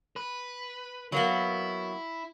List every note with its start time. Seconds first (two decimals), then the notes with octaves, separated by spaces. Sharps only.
0.16 B4
1.12 F#3 A#3 B3 E4